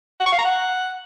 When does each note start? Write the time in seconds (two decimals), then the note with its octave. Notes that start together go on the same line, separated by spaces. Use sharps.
0.20 F#5
0.26 C#6
0.32 F5
0.38 A#5
0.45 F#5